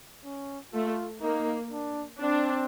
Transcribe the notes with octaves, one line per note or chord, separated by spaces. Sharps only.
C#4
A3 F4
A#3 D#4
D4
C4 D4